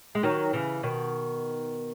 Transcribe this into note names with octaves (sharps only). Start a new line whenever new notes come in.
G#3
D#3 F#3
C#3 E3
B2 D#3